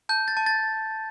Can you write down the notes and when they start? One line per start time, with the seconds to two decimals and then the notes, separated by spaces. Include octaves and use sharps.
0.09 A5 G6
0.28 A6
0.37 A5
0.46 A6